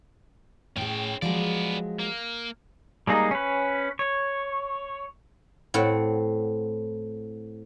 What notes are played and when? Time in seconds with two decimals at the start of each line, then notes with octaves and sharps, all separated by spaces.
0.76 A2 C#4 G#4 G5
1.22 F3 F#3 G#3 B3 D5
1.99 A#3
3.07 G3 G#3 A#3 D#4
3.31 C#4 B4
3.99 C#5
5.74 A2 C4 F#5